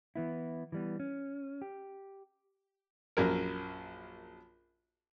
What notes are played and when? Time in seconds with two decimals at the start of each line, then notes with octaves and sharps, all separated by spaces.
0.16 E3 B3 E4
0.72 E3 G3 B3
1.00 C#4
1.62 G4
3.17 A#1 F#2 A#4